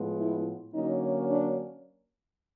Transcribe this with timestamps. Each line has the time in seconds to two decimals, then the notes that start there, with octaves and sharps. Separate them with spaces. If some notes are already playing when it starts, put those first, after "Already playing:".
Already playing: A2 F3 G#3 B3
0.19 E4
0.74 D3 F#3 A#3 C#4 D#4
1.30 D4